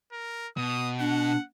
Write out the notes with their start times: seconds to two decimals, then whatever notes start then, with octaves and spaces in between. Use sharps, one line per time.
0.12 A#4
0.57 B2 D#6
0.99 D4 F#5